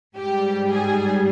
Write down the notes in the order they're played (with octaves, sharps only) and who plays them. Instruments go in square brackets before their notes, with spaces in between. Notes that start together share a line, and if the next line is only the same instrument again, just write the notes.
[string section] G#2 G3 G4
G#4